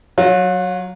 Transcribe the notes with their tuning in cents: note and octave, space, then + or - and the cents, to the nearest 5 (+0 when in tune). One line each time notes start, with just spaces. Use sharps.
F#3 +0 F4 +40